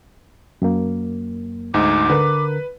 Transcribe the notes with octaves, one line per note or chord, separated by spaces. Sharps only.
F#2 A#3
D2 G#2 D#4 D6
D3 A#4 B4